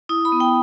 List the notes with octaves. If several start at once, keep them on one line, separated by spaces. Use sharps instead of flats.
E4 D#6
B5
B3
G5